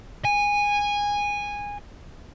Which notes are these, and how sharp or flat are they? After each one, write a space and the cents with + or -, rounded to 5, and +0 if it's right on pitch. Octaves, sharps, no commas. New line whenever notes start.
G#5 -15